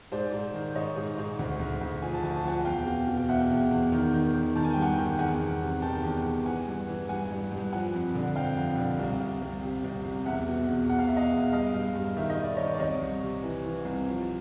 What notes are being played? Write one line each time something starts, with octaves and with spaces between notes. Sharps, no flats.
G#2 C5 D5
G#2
D#3
G#2 C#5 D#5
G#2
G#2
D2
D2
D2
F3 G#5
A5
D2 G#5
A5
F3 F#5 G#5
E2 F5 G5
B2
B2
G5
E2 E5 F#5
E2
E2
D#3
D#3
D#3
D#3 A5
G#5
G2 G5
F#5 G#5
D#3
E2 F#5 G#5
E2
C3
D#3 G5 A5
E2
E2
E3 F#5 G#5
G2
E3
G2 F#5 G#5
G2
G2
F3 F#5 G#5
F2
D3
F2 F5 G5
F2
D3
C2
C2
C2
C3
C2
C2
E2 E5 F#5
B2
E2
B2 F#5
F5
B2 E5
D#5 F5
E2
G2 D#5 F5
G2
G2
D#3 E5
D#5
D#3
D5
D#3 C#5 D#5
D5
C2 C#5 D#5
C2
C3
E3
E3
C2
F3